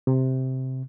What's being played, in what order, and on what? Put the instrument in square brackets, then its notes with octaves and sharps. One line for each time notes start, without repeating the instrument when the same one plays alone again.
[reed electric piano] C3